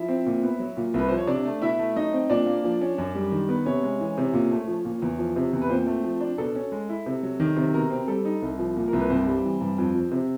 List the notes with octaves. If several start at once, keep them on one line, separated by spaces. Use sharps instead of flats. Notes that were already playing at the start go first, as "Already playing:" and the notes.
Already playing: F3 E4 E5
C4
A#2
B3
F#3
A#2
C2 B4
F3 C5
C#5
C3 D4 D5
A3
B2 E4 E5
A3
F#3 D#4 D#5
C4
A#2 D4 D5
A#3
F3
C#4
F#2
G3
D#3
B3
C3 C#4 C#5
G#3
E3
C3
A#2
A3
F3
A#2
E2
F3
C3
E2
B4
A#2 C4 C5
A3
F3
D4
B2 A4
C#4
G#3
E4
C3
F#3
D#3
C3
B2 A#4
C4
G3 A4
D#4
C2
F3
A#2
C2 A#4
B4
G2 C4 C5
G3
E3
G2
F2
F3
C3